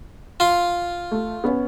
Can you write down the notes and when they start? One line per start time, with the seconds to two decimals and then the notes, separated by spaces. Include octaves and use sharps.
0.40 F4 C6
1.11 A3
1.44 B3 C#4